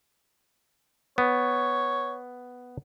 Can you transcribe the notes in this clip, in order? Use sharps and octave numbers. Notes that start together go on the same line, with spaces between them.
B3 C#5